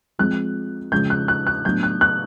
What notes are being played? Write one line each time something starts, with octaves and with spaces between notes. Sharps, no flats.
F3 G#3 C4 F#6
C#3 F3 G#3 C#4 G6
F#6
F#6
F#6
A2 F#3 B3 D4 G6
F#6
F#6